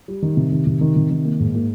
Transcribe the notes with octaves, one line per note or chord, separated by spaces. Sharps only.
G3
D#3
C3
D#3
C3
D#3
C3
D#3
A#3
G#2
A#3